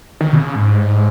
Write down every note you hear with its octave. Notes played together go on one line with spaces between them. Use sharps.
D#3
B2
C#3
G#2